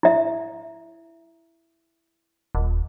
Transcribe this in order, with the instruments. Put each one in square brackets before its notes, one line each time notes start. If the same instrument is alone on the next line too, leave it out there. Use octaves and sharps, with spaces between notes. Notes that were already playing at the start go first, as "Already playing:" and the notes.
[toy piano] E4 E5
[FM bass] D#1